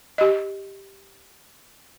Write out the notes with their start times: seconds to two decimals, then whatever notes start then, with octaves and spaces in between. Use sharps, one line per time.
0.18 G4 D#5